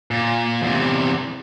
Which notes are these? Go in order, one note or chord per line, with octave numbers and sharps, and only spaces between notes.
A#2
E2 C3